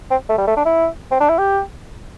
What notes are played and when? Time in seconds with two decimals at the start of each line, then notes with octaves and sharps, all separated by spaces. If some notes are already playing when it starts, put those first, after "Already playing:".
0.11 C4
0.29 A3
0.38 G3
0.48 A3
0.57 D4
0.66 E4
1.11 C4
1.20 D4
1.29 E4
1.38 G4